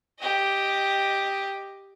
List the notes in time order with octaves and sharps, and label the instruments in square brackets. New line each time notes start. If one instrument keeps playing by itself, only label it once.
[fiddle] G4 D#5